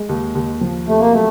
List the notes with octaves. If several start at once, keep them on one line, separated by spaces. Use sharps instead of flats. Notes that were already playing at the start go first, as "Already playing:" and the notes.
Already playing: G#3
D#2
D#2
F3
C3 A3
A#3
F#3 A3